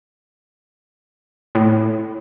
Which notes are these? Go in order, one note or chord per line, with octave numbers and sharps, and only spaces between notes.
A2